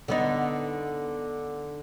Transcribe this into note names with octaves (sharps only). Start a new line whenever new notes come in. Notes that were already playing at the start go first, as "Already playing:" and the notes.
D3 B3 D#4